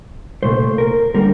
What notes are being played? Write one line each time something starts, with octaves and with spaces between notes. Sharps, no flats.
C2 A#2 A3 C5
A#4
D3 G3 A#3 A#4